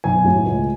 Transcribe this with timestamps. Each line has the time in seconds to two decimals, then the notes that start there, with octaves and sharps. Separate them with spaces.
0.04 B1 G#5
0.24 A2 F#3
0.45 C#2